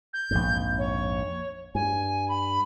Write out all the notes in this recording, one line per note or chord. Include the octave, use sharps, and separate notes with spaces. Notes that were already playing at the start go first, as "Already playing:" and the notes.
G6
A#1 F2 G#2
C#5
G2 G#5
B5